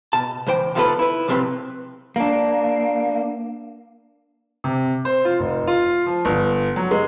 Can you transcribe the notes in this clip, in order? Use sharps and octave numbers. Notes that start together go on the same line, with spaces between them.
B2 A5
C#2 E3 C5 G5
D#3 F3 A3 B3 A4 B4
E4 B4
A2 C3 F3 C4 G4 B4
A#3 D4
C3
C5
F4
F1
F4
F3
G1
F#3
G#3